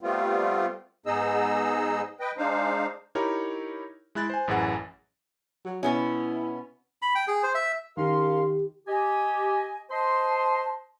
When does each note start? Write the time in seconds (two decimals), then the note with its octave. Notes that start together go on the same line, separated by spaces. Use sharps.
0.01 G3 A3 B3 C4 F4
1.06 G#2 B3 D#4 G#4 D#5 E6
2.20 B4 D#5 G5
2.38 G#3 D4 D#4 C5 F5
3.15 D#4 E4 G4 A#4 C#5
4.15 G#3 E4 F#6 A6
4.30 C5 G#5
4.48 A1 F#2 E3 G#4 F#5
5.65 F#3
5.83 B2 B3 C#4 E4
7.02 B5
7.15 G5
7.28 G#4
7.43 C5
7.55 E5
7.97 D#3 C#4 G4 A#4 F5 C6
8.88 G4 D#5 G#5
9.90 C5 D#5 A5 C6